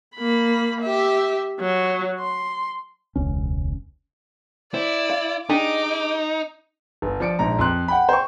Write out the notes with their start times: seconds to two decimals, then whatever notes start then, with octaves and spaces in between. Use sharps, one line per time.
0.16 A#3 B5
0.82 G4 E5
1.60 F#3
2.20 C6
3.16 E1 C#2 C#4
4.74 E4 C5 D5
5.10 F5
5.49 D4 D#4 G4 G#4 D6
7.02 G1
7.20 F3 D5 C#7 D7
7.39 A#1 G#2 A#5
7.59 F2 C6 F#6
7.88 F#5 G5 B5
8.09 C5 G5 C#6